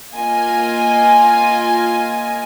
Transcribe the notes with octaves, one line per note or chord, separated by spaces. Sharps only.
A#3 F4 D#5 G#5